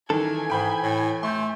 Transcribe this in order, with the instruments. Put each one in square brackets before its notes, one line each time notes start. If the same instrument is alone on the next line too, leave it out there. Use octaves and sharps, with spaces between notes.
[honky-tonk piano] D#3 [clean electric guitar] E3 A4 [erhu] G#5
[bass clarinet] G#2 [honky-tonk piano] G5 B5 G6
[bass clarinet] A2
[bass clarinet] A3 [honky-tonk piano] C6 G6